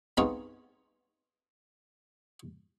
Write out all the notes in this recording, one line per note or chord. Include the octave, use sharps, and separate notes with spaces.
B3 C4 D#4 F4 G#4 C#5